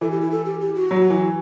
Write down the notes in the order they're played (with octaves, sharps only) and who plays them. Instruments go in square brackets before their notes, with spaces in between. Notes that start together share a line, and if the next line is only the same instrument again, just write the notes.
[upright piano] E3 [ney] A4
[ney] G4
E4
A4
G4
G4
F#4
[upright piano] F#3
E3